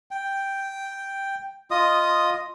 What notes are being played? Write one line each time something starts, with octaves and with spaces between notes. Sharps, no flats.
G5
F4 D#5 D#6